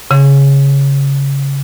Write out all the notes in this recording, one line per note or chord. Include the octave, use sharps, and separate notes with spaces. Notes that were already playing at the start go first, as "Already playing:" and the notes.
C#3